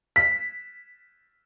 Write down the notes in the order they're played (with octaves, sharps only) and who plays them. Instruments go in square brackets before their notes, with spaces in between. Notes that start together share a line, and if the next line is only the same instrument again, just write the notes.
[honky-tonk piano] B6